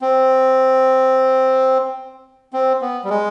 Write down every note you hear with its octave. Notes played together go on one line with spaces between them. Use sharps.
C4
C4
B3
G3
G#3